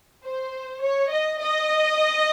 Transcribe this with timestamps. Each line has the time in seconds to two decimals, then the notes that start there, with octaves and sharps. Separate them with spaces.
0.25 C5
0.82 C#5
1.12 D#5
1.41 D#5